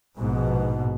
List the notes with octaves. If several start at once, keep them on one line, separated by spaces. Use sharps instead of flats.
A#1 G#2 B2